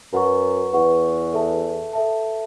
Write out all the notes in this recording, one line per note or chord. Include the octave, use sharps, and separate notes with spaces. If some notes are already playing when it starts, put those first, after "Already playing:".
F#2 B4 F#5 C#6
E2 B4 F#5 C#6
A4 E5 A5
A4 E5 A5